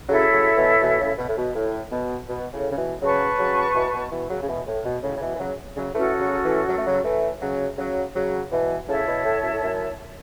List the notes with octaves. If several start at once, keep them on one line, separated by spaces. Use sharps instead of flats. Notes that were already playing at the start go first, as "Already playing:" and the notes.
C#3 F#3 E4 A4 C#5 E5
C#3 F#3
B2 E3
B2 E3
A2 C#3
B2
A2
B2
A2
B2
B2
A2 C#3
C#3
B2 E3
C#3 F#3 B4 A5 C#6
C#3 F#3
B2 E3
B2
B2 E3
C#3 F#3
C#3
B2 E3
A2
B2
A2 C#3
C#3
B2 E3
E3
C#3 F#3
C#3 F#3
E3 A3 C#4 F#4 A4
C#3 F#3
E3 A3
F#3
A3
C#3 F#3
E3 A3
C#3 F#3
C#3 F#3
C#3 F#3
B2 E3
A2 C#3 E4 C#5 A5
B2
A2
F#2
A2
F#2